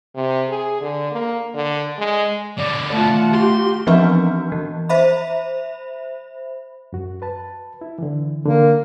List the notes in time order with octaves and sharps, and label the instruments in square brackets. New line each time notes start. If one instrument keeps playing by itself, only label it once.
[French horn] C3
G#4
D3
A#3
D3
G#3
[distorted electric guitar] B2 D3 [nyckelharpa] D5
[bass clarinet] A3 [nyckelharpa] F4 [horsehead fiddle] F#5 A5
[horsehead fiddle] F#4 G4 [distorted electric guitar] C6
[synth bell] E3 F3 B3 C4 D4 F#4
E3
C5 E5 B5
[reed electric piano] F#2 F#4
B4 A5
E4
D3 E3
[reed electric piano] D3 [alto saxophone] A#3